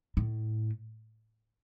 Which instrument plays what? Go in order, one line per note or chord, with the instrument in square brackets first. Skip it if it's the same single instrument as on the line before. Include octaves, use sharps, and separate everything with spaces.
[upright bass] A2